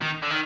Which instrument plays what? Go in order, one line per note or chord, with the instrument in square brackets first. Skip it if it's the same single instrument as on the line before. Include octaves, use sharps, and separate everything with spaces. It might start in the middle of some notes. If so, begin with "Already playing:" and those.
[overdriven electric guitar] D#3
D3
D#3